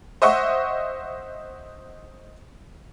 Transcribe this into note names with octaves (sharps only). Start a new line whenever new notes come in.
C5 D#5 E5 F#5 C#6